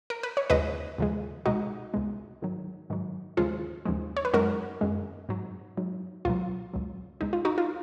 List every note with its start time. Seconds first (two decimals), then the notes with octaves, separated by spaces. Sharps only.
0.10 A#4
0.23 B4
0.37 C#5
0.50 D#2 C#3 F3 G#3 B4 D#5
0.98 D#2 C#3 F3 G#3
1.46 C#2 B2 G#3 D#4 F#4
1.94 C#2 B2 G#3
2.42 G#2 D#3 F#3
2.90 G#2 D#3 F#3
3.37 D#2 C#3 F3 G#3 F4 G#4
3.85 D#2 C#3 F3 G#3
4.17 C#5
4.25 B4
4.33 F#2 D#3 G#3 F#4 A#4
4.81 F#2 D#3 G#3
5.29 G#2 F#3
5.77 G#2 F#3
6.25 C#2 B2 F#3 F4
6.74 C#2 B2 F#3
7.21 C#2 B2 G#3 D#4
7.33 F4
7.45 D#4 F#4
7.58 F4